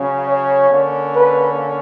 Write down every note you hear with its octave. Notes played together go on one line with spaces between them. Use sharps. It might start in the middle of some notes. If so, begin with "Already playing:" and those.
Already playing: C#3 F#3 C#4
C#5
D3 A#3 C#4
B4